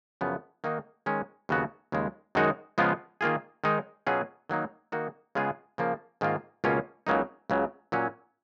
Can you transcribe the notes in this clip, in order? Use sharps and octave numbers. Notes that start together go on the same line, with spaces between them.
F#2 C#3 F3 B3
D#3 A#3 D#4 F#4
D#3 G#3 C#4
D#2 C#3 F#3 B3 F#4
D#2 C#3 G#3
F#2 D#3 G#3 D#4 F#4
C#3 F3 G#3 B3 F4
D#3 A#3 F4 G#4
D#3 G#3 D#4
B2 F#3 C#4 F4 G#4
D#3 F#3 A#3 D#4
D#3 A#3 D#4 F#4
C#3 G#3 B3 F4 G#4
C#3 F3 A#3
G#2 D#3 A#3 F4
C#2 B2 A#3 C#4 F4
C#2 C#3 F#3 A#3 D#4
C#2 C#3 F#3
A#2 F#3 C#4